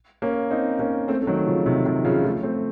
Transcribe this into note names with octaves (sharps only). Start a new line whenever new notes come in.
A#3 C#4
C4 D#4
A#3 C#4
A3 C4
A3
D#3 F#3
C#3 F3
C3 D#3
C3 D#3
C#3 F3
F3 A3
A3 C4